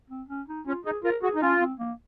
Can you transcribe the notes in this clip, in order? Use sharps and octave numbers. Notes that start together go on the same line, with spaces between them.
C4
C#4
D#4
C#4 F4
D#4 G#4
F4 A#4
F#4 G#4
D#4
C#4 F4
C4
A#3